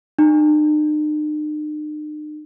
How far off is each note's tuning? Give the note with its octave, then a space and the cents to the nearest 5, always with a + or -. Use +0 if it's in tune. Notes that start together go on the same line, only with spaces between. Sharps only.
D#4 -45